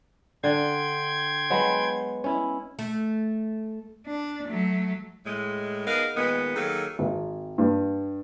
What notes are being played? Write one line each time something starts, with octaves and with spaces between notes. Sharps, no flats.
D3 G5 C6 G#6
F#3 G#3 B3
C#4 E4
A3
D4
F#3 A3
A2 G#3
B3 D#4 G#4 A#4 F5
A#2 D#3 G#3 B3
D#3 F#3 A#3 G#4 A4
G#1
G2